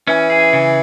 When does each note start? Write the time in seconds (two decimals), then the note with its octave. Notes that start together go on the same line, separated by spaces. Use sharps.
0.07 E3 C#4
0.30 G#4
0.53 C#3